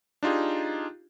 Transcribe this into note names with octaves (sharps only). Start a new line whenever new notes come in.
D4 D#4 F4 G4 G#4